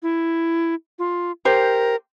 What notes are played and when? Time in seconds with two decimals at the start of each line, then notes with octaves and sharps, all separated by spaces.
0.03 E4
0.99 F4
1.45 G4 A#4 C5